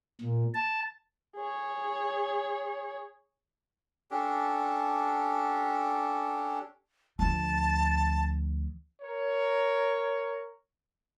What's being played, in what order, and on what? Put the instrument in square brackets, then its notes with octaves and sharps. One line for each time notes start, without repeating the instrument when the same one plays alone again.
[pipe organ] A#2
A5
[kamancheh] G#4 C#5
[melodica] C#4 D4 G4 A4
[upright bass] D2 F3 [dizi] A5
[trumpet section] A#4 C#5